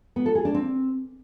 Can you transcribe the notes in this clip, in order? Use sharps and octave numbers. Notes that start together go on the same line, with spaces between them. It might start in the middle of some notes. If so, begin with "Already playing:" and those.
B3
A4
G#4
D4
C4